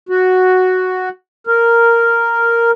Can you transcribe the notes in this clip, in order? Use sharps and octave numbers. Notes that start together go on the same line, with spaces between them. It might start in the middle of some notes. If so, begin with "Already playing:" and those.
F#4
A#4